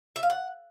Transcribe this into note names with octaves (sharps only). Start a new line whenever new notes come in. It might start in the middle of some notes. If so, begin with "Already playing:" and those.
E5
F5
F#5